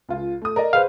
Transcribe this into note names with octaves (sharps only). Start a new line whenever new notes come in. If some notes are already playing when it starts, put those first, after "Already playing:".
C#2 F4
A3 D#6
A#4 D5 D#5
G#4 B4 C5 F5